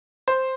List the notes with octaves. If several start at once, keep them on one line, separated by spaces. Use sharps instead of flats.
C5